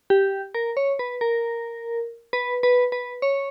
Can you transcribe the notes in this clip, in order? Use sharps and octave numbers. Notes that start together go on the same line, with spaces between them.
G4
A#4
C#5
B4
A#4
B4
B4
B4
C#5